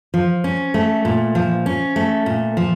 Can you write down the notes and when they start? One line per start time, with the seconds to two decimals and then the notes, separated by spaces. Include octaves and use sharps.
0.14 F3
0.44 C#4
0.74 A3
1.05 A#2
1.35 F3
1.66 C#4
1.96 A3
2.26 A#2
2.57 F3